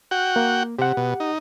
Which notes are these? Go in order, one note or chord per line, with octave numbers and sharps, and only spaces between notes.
F#4 F#5 G5
A#3
C3 G4 F#5
B2
D#4